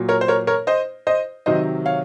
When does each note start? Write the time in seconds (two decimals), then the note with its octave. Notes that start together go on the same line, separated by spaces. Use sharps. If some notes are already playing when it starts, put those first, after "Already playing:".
Already playing: A#2 F#3
0.09 A#4 C#5
0.21 C5
0.28 A#4 C#5
0.47 A#4 C#5
0.67 C5 D#5
1.07 C5 D#5
1.46 C3 D#3 F#3 C5 D#5
1.86 C#5 F5